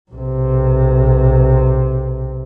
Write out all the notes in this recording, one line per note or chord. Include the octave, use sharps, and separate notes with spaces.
B1 C3